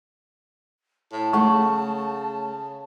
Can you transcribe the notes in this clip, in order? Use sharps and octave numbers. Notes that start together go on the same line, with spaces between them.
A2 A5
C#3 A3 F#5 C#6